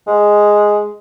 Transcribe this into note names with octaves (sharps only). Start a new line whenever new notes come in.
G#3